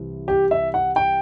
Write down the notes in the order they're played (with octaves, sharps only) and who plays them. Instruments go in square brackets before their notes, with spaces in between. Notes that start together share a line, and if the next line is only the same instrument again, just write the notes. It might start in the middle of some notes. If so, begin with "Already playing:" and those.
Already playing: [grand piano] C2 C3 E3
G4
E5
F#5
G5